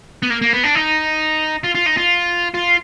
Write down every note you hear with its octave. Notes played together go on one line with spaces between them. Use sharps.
B3
A#3
A#3
B3
D4
D#4
F4
F4
D#4
F4
F4